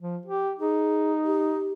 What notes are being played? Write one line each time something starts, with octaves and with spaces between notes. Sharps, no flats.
F3
G4
D#4 G#4
G4